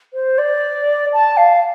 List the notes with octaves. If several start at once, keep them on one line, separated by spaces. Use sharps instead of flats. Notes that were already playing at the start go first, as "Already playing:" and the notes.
C5
D5
A5
F5